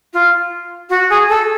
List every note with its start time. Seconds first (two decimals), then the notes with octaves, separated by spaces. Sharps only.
0.13 F4
0.89 F#4
1.10 G#4
1.29 A4